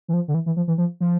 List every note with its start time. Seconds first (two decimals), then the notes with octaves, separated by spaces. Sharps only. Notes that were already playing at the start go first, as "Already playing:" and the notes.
0.08 E3
0.13 F3
0.28 D3
0.34 E3
0.46 E3
0.56 F3
0.68 E3
0.78 F3
1.00 F3